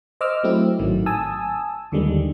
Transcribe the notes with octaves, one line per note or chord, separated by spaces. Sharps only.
C5 D#5 D6 E6 F6
F#3 A3 C4 E4
G#1 A2 D#3 F#3
G#5 A5 D#6 E6
D#2 D3 D#3 G3 G#3